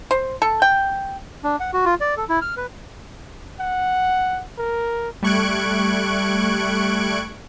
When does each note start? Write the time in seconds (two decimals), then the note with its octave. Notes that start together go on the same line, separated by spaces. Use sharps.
0.11 C5
0.42 A4
0.62 G5
1.44 D4
1.60 F#5
1.73 F#4
1.85 F4
2.01 D5
2.17 A4
2.29 E4
2.42 F6
2.57 B4
3.60 F#5
4.58 A#4
5.23 G3 A3 C#6 F#6 G#6 D7